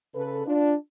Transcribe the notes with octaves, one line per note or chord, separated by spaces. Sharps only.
C#3 A4 B4
D4 F4